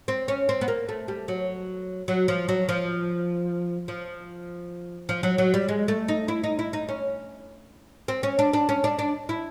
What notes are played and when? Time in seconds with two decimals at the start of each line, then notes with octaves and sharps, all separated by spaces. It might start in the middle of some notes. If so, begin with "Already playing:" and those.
0.08 C4
0.28 C#4
0.49 C4
0.61 B3
0.68 A#3
0.89 A3
1.08 G3
1.28 F#3
2.08 F#3
2.28 F3
2.49 F#3
2.69 F3
3.88 F3
5.09 F3
5.23 F#3
5.38 F#3
5.54 G3
5.69 G#3
5.88 A3
6.08 D#4
6.28 E4
6.44 D#4
6.59 E4
6.73 D#4
6.89 C#4
8.08 C4
8.23 C#4
8.39 D4
8.53 D4
8.69 C#4
8.84 D4
8.99 D4
9.29 E4